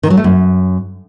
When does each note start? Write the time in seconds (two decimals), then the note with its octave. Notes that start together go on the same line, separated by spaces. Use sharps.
0.03 D#3
0.10 F#3
0.17 A3
0.24 F#2